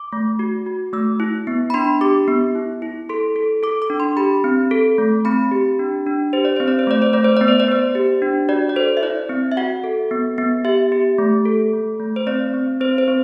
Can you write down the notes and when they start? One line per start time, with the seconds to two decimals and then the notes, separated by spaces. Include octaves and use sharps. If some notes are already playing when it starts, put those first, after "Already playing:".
Already playing: D6
0.12 A3
0.39 F#4
0.66 F#4
0.93 A3 E6
1.20 E4
1.47 B3
1.70 B5
1.74 D4 C6
2.01 G4 D6
2.28 B3
2.55 E4
2.82 E4
3.09 A4 C6
3.36 A4
3.63 A4 D6
3.82 D6
3.90 D4
4.00 C6
4.17 G4 B5
4.44 C4
4.71 A4
4.98 A3
5.25 C4 B5
5.51 G4
5.79 D4
6.06 D4
6.33 G4 C5
6.45 D5
6.56 C4 C5
6.68 D5
6.79 C5
6.87 A3 D5
7.02 C5
7.13 A3 D5
7.24 C5
7.37 B3 D5
7.48 C5
7.60 D5
7.68 B3 C5
7.95 G4
8.22 D4
8.49 F#4 D5
8.69 D5
8.76 A4 C5
8.97 E5
9.03 E4 D5
9.29 C4
9.52 E5
9.57 F#4 F#5
9.84 A4
10.11 B3
10.38 B3
10.65 G4 E5
10.92 G4
11.18 A3
11.45 A4
11.73 A3
11.99 A3
12.16 C5
12.27 C4 D5
12.54 C4
12.81 C4 C5
12.98 C5
13.08 C4